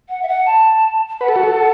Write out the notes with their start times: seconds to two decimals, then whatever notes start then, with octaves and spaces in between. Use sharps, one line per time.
0.09 F#5
0.23 E5
0.28 F#5
0.46 A5
1.21 B4 F#5
1.28 A4
1.36 F#4
1.43 A4